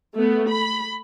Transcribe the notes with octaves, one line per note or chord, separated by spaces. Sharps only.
A3 B3
B5